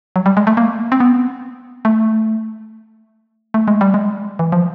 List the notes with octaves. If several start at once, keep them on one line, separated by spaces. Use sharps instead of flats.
F#3
G3
G#3
A3
A#3
C4
B3
A3
A3
G#3
G3
G#3
E3
F3